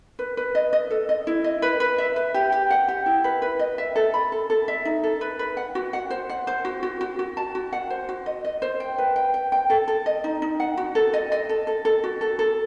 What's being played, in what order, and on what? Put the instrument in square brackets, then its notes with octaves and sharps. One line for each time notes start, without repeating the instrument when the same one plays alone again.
[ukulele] B4
B4
D#5
D#5
A4
D#5
E4
D#5
B4
B4
E5
B4
G4
G4
F#5
G4
E4
B4
B4
D#5
E5
A4
B5
A4
A4
E5
D#4
A4
B4
B4
F#5
F#4
F#5
C5
F#5
C5
F#4
F#4
F#4
F#4
A5
F#4
F#5
C5
F#4
D#5
D#5
C5
G5
B4
G5
G5
G5
A4
A4
D#5
D#4
D#4
F#5
F#4
A4
D#5
D#5
A4
A4
A4
F#4
A4
A4